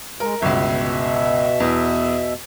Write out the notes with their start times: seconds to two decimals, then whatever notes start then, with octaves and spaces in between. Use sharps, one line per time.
0.20 G#3 A#4
0.42 G1 C#2 B2 E5
1.60 E2